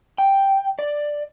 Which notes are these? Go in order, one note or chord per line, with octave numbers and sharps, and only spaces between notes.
G5
D5